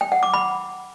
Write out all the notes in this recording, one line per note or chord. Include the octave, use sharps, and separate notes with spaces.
G5
F#5
D6
B5